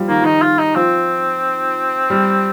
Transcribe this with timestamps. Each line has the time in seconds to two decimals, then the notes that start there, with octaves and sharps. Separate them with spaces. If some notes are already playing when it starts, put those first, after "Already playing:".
Already playing: F3 G3
0.08 D#3 A#3
0.22 D#3 D#4
0.42 F4
0.59 D#4
0.75 F3 C4
2.10 G3